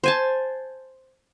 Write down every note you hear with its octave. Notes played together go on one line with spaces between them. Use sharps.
C5 G#5 A5